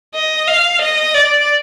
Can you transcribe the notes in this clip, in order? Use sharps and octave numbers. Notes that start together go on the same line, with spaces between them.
D#5
F5
D#5
D5